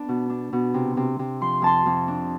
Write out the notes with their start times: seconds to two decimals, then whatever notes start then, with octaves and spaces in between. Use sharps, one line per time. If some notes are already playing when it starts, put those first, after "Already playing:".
Already playing: B3 D4
0.09 B2
0.30 D4
0.53 B2
0.74 C3
0.97 C3
1.19 C3
1.41 F3 C6
1.62 F2 A5 C6
1.86 F2
2.08 D4